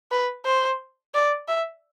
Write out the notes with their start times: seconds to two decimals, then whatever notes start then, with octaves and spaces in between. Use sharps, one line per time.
0.11 B4
0.46 C5
1.14 D5
1.48 E5